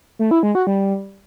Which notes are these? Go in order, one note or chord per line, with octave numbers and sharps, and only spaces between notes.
A3
E4
G#3
F#4
G3